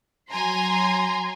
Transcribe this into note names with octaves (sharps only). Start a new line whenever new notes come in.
F#3 G#5 A#5 C6